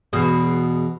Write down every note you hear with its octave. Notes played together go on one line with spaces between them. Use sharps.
E2 B2 G#4